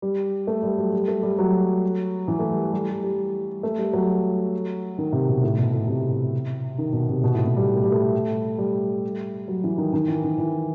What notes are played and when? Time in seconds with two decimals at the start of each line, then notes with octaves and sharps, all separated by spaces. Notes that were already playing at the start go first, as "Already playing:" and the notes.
0.02 G3
0.47 A3
0.63 G3
0.78 F#3
0.92 G3
1.08 A3
1.23 G3
1.39 F#3
2.28 E3
2.39 A3
2.51 G3
2.73 G3
2.89 G3
3.03 G3
3.63 A3
3.78 G3
3.93 F#3
4.98 D#3
5.13 C3
5.29 B2
5.44 A2
5.58 B2
5.73 A2
5.88 C3
6.78 D#3
6.93 B2
7.09 C3
7.24 B2
7.34 A2
7.46 B2
7.56 G3
7.76 A3
7.84 G3
7.92 A3
8.58 G3
9.48 F#3
9.64 E3
9.78 D#3
9.93 D#3
10.08 E3
10.24 D#3
10.38 E3